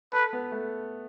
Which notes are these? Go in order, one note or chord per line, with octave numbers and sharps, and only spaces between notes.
A4 B4
B3
A3